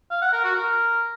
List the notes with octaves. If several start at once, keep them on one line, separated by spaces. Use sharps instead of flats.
F5
F#5
A#4
F#4
A#4